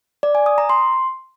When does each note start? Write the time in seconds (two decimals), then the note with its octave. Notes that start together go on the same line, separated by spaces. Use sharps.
0.23 D5
0.35 G#5
0.46 D#6
0.58 A#5
0.69 C6